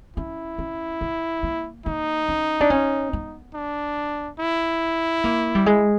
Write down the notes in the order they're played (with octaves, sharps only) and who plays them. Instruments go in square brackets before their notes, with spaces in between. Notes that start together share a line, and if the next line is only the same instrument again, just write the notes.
[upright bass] C#4 [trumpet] E4
[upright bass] C#4
B3
A#3
[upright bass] A#3 [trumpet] D#4
[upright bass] C#4
D4
C#4
B3
[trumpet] D4
E4
[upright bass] A#3
G3
G#3